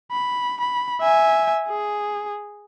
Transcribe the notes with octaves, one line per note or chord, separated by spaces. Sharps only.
B5
B5
E5 G#5
G#4